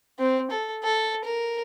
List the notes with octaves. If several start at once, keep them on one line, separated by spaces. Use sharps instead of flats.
C4
A4
A4
A#4